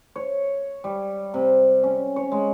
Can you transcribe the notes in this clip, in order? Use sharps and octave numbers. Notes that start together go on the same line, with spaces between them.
C#5
G3
C3
C#4
C#5
G#3